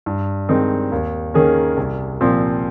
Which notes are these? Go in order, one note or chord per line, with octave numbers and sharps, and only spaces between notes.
G2
D#3 G#3 C4 D#4
D#2
D#3 A#3 C#4 G#4
C2
A#2 F3 C4